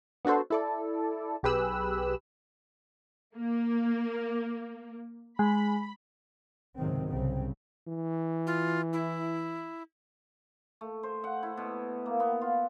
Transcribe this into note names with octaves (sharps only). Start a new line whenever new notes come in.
B3 D4 F#4 A4 C5
E4 A4 D5
B1 G4 G#4 B4 E6 F#6
A#3
G#3 B5
C#2 G#2 C3 D#3 F#3 C4
C2 C#3 C4
E3
F4
E4
A3
C5
F#5
E4
B2
A#3
B3
F4